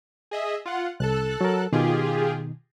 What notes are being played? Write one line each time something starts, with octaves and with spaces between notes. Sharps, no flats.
G#4 D#5 E5
F4 F#5
C2 A4 A5 F#6
F#3 A#4
B2 D#3 F4 G4 G#4